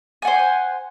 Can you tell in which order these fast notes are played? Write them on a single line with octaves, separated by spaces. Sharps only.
G#5 F#5 C5